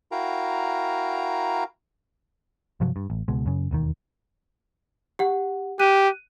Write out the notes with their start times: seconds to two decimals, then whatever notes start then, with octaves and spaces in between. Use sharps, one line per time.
0.12 E4 F#4 A#4 F5 G5 A#5
2.80 G2 C3 F3 F#3
2.96 G2
3.10 A1
3.28 C#2 B2 G#3
3.46 F#2 C#3
3.71 E1 D#2 D#3
5.19 G4 F#5
5.79 G4 F#6 D#7